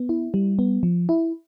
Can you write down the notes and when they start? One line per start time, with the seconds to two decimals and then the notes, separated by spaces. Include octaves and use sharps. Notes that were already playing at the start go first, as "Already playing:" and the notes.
Already playing: B3
0.09 E4
0.34 G3
0.59 B3
0.83 F3
1.09 E4